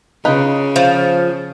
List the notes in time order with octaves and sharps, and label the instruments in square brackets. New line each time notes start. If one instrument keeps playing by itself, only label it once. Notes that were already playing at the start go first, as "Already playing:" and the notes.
[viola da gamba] C#3 [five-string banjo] D#4 F4 B4
[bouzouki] F3